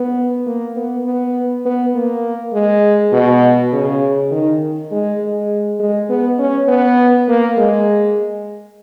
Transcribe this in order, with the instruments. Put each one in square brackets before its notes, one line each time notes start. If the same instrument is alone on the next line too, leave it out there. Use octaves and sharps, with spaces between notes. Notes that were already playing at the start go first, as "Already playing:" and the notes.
Already playing: [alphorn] B3
A#3
B3
B3
B3
A#3
G#3
B2
C#3
D#3
G#3
G#3
G#3
B3
C#4
B3
A#3
G#3